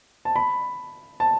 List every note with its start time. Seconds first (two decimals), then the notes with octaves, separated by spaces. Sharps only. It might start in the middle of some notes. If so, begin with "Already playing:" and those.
0.25 A5
0.36 B5
1.20 A5